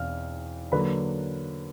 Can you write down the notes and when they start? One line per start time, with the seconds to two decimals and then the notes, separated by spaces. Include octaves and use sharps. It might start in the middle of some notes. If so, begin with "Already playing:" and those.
Already playing: E2 B2 C4 F5 F6
0.72 D3 F#3 A#3 B4 B5